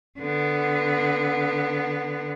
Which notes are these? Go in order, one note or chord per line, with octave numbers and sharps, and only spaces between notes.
D3 B3